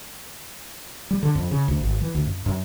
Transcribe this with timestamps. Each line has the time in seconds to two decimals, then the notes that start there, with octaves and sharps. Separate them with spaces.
1.11 G3
1.23 D3
1.35 F2
1.51 C#3
1.68 D2
1.81 G#1
2.01 E3
2.15 D2
2.26 F#2
2.46 F#2